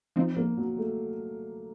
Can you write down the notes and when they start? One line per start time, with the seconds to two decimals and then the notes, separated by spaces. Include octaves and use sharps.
0.16 F3 C4 D#4
0.37 A#3
0.57 F#3
0.78 A3